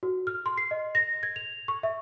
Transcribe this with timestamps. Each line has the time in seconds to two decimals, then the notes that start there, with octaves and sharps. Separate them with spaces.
0.03 F#4
0.27 F6
0.46 C6
0.58 C7
0.71 D#5
0.95 A#6
1.23 G#6
1.36 F7
1.68 C#6
1.83 E5